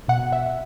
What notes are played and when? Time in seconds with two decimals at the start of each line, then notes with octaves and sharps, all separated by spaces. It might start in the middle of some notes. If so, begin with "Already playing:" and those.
0.08 B2 F#5
0.32 E5